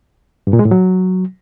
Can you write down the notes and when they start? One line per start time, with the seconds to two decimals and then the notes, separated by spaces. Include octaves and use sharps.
0.47 G2
0.53 A#2
0.59 G#3
0.65 A2
0.71 F#3